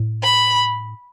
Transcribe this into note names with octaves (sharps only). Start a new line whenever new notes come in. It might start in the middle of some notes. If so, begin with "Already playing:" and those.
Already playing: A2
B5